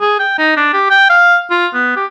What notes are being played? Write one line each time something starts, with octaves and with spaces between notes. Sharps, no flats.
G#4
G5
D#4
D4
G4
G5
F5
F4
B3
G4